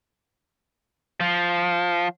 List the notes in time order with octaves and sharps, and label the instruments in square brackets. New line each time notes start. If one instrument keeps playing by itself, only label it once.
[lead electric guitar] F3